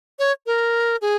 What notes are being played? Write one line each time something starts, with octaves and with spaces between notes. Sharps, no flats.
C#5
A#4
G#4